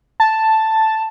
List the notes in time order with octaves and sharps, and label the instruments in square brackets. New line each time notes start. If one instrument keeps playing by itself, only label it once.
[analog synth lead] A5